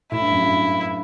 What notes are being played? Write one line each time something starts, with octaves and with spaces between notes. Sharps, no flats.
A2 E4
G2
F#2
G2